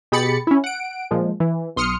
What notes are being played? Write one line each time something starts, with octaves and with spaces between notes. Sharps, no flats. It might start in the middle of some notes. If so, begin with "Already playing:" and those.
B2 G4 G#4 B5 A6 C#7
C#4 E4
F#5 D7
A#2 F3 G#3
E3
B1 C6 D#6 F6 C#7